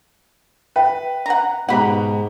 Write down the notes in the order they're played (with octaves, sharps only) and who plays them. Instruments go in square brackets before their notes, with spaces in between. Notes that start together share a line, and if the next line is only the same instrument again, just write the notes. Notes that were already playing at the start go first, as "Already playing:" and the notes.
[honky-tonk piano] B4 [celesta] E5 G5
[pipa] F#5 A#5
[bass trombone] G#2 [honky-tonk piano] B2 G4 A#5 [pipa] F#5 B5